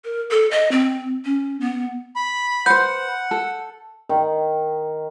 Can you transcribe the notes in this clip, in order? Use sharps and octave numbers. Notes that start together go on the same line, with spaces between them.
A#4
A4
D#5
C4
C#4
B3
B5
B4 C5 F#5 G6
A4
D#3